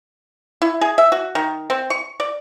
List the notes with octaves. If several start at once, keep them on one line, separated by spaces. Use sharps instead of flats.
E4
G#4
E5
F#4
D#3
C4
C#6
D5